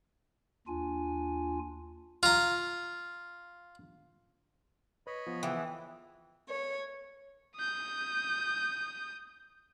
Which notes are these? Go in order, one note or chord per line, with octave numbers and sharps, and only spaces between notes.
D#2 D4 F4 G#5
F4 A#5
B4 C#5 D#5 B5
F3 B3
E3 E4 G#4 F#5 G5
C#5
D#6 G6